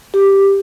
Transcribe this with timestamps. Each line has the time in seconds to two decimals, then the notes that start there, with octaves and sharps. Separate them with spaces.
0.14 G4